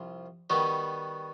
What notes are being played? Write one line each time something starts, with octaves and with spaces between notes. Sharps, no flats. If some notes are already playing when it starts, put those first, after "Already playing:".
Already playing: C2 C3 F3
D#3 G3 B3 D#4 F#4